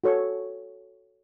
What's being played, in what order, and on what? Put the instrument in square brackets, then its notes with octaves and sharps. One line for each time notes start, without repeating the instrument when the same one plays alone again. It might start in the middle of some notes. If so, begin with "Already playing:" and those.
[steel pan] F#4 A4 C#5 C#6